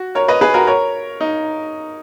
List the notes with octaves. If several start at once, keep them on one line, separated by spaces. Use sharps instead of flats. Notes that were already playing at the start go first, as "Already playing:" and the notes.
Already playing: F#4
A#4 C#5
B4 D#5
G#4 B4
F#4 A#4
A#4 C#5
D#4